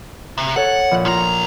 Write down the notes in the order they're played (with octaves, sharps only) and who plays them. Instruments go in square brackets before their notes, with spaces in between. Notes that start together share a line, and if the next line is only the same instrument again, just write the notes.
[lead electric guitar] C3
[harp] A4 C#5 [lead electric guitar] F#5
[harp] A#1
[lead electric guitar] B1 A#5 [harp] F4